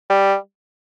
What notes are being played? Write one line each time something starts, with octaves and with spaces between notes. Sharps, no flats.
G3